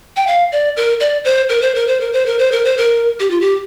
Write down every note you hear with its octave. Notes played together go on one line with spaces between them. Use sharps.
G5
F5
D5
A#4
D5
C5
A#4
C5
A#4
C5
A#4
C5
A#4
C5
A#4
C5
A#4
G4
F4
G4